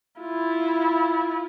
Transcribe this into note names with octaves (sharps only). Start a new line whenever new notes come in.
E4 F4